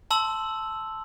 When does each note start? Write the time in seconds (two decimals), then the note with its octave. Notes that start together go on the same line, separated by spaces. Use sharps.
0.11 A5 C6 E6 F#7